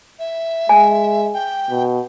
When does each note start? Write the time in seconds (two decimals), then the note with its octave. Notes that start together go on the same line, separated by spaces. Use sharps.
0.19 E5
0.69 G#3 G#5
1.33 G5
1.70 B2